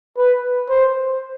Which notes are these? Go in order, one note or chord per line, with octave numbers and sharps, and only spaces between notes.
B4
C5